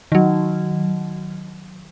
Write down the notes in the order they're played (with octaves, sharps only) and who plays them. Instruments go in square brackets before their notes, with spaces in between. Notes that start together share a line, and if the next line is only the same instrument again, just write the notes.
[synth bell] D#3 F#3